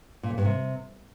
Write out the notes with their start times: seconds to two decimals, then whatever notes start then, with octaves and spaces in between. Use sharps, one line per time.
0.23 A#2
0.31 F2
0.38 G2
0.45 C3